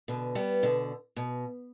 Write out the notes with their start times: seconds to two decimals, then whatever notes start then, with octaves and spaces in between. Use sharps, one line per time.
0.08 B2 D3
0.35 G3 B3
0.63 B2 D3
1.16 B2